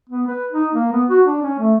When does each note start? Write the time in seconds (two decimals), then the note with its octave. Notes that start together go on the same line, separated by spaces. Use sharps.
0.09 B3
0.27 B4
0.52 D#4
0.73 A#3
0.92 B3
1.10 F#4
1.25 D4
1.42 C#4
1.59 A3